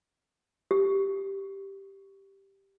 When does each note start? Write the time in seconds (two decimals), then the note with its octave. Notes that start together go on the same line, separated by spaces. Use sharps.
0.71 G4